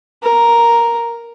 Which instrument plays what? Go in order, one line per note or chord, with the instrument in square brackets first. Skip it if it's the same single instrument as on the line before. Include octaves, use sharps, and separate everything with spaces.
[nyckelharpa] A#4